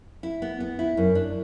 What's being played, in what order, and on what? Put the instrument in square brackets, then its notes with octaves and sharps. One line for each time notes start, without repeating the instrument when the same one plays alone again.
[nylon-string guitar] E4
B3
B3
E4
F#2
D4